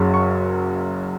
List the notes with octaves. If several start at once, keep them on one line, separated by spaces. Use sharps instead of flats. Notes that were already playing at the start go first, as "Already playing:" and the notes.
Already playing: F#1 F#2 C#3 F#3
C#6